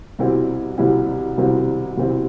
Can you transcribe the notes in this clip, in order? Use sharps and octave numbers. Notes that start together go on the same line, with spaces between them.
C2 B2 G3 C4 E4
C2 B2 G3 C4 E4
C2 B2 G3 C4 E4
C2 B2 G3 C4 E4